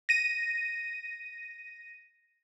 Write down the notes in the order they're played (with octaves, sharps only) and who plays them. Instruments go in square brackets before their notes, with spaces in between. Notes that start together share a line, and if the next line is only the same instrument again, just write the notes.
[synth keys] A#6 D#7